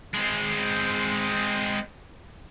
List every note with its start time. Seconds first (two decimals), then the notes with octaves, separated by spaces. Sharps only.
0.14 G#3 C4